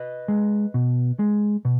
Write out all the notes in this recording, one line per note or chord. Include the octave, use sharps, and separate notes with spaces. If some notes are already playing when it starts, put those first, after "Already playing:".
Already playing: B4 D#5
G#3
B2
G#3
B2